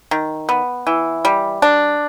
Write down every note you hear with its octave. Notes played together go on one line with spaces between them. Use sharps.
D#3
B3
E3
G3
D4